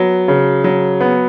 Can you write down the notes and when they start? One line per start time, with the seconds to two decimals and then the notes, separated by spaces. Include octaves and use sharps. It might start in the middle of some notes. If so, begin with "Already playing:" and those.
Already playing: F#3 B3
0.28 C#3
0.64 F#3
1.01 B3